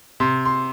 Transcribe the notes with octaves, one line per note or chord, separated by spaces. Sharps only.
C3 C6
C6